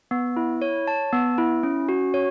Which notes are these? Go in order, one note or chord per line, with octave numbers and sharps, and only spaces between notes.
B3
E4
C#5
A5
B3
E4
C#4
F#4
C#5